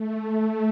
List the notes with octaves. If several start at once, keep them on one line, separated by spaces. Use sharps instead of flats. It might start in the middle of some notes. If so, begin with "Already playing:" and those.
Already playing: A3